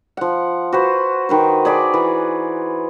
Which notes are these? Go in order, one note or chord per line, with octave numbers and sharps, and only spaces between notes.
F3 F#5
F#4 B4 C5
D#3 B4 C5
G#4 D5 B5 D6
E3